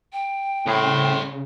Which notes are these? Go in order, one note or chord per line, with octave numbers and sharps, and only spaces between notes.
G5
C2 A2 C#3 C5